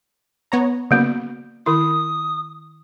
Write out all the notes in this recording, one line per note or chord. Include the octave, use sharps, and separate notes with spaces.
B3 C#5 A#5
C#3 F#3 A#3 B3 F#4
D#3 E4 D#6